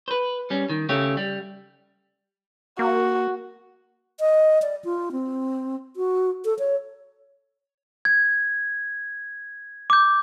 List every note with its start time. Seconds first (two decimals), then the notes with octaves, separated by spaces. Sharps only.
0.08 B4 C5
0.50 G3 C#4
0.70 D#3
0.89 C#3 A3 G4 C#5
1.17 G3
2.79 A#3 F#4
4.20 D#5
4.62 D5
4.85 F4
5.12 C4
5.96 F#4
6.45 A4
6.59 C#5
8.05 G#6
9.90 D6 G6